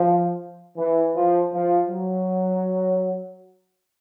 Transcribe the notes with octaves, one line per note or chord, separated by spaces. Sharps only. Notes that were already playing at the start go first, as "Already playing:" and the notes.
Already playing: F3
E3
F3
F3
F#3